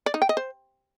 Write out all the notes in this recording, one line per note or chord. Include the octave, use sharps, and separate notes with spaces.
D5
D#4
G5
D#5
C5